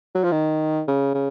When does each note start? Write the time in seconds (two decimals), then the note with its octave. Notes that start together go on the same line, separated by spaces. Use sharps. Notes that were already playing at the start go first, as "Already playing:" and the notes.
0.15 F#3
0.24 F3
0.32 D#3
0.88 C#3
1.14 C#3